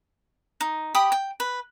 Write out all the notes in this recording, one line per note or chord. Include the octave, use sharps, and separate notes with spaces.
D#4
G4 G5 B5 D#6
G5
B4